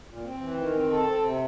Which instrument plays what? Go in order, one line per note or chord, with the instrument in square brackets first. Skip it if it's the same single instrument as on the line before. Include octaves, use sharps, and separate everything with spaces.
[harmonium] A#2
C4
E3
D#3
C4
A4
C4
C3